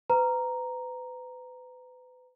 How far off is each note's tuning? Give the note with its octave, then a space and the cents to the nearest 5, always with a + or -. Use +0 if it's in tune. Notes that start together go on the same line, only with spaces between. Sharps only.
B4 +35 A#5 +0